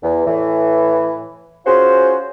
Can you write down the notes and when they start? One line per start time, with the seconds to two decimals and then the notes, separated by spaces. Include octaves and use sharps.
0.03 E2
0.25 A2 E3
1.65 C#4 F4 F#4 G#4 C5